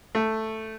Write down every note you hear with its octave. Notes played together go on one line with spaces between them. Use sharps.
A3